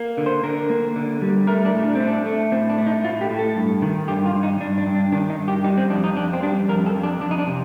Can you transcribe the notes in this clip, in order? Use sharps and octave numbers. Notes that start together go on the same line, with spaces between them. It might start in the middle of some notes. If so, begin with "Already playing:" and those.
Already playing: A#3
D3
C5
D3 A#4
A#3
D3
G3
A3 A#4
D4
A2
D4
A3 C4
D4
A3
A2 C4
D4
A3
D#4
A2 F4
G4
A2
A4
G2
D#3
G2 G4
F4
G2
D#4
G2 D4
D4
G2
D4
D#3 D4
D#4
G2
G4
G3 D#4
C4
F2 D4
D#4
F2 D4
C4
G3 D4
F2 A#4
A4
F2
D4
F2 D4
D#4
D4
C3